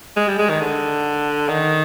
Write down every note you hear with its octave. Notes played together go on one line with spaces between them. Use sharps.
G#3
G3
G#3
D#3
D3
D#3